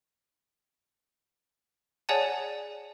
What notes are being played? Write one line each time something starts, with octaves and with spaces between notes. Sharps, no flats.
G#4 C#5 D5 F#5 G#5 A5